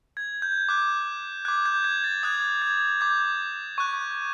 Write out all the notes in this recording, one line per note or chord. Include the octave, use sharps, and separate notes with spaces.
G#6
G6
D6 F#6
D6 F#6 G#6
G6
G#6
A6
D#6 F#6 G#6
G#6
D6 G6
C#6 F#6